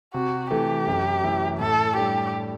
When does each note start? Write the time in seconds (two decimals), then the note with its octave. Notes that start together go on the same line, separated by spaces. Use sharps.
0.14 C3 F#4
0.51 E3 A3 G4
0.87 F#2
1.24 E3 A3 E4 A4
1.60 A2 A4
1.96 G3 D4 G4 A4